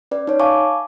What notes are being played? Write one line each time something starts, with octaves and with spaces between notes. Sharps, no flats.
C#4 B4 D5
D#4 C#5
E5 F5 G#5 A5 C#6 D6